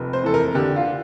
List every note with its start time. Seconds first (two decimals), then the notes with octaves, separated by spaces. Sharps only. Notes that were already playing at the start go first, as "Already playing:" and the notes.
Already playing: F1 F2
0.13 C5
0.23 E3 A4
0.34 A#4
0.55 D3 G4
0.76 F4